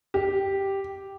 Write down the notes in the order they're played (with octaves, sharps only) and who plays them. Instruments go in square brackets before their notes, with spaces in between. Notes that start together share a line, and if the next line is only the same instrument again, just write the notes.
[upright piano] G4